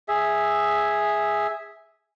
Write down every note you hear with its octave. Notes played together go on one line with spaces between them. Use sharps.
G#4 E5